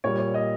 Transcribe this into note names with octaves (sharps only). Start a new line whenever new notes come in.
A#2 G3 C#5
C#5
D#5